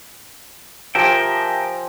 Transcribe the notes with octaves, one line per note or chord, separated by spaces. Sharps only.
F3 G4 A#4 E5 G5 G#5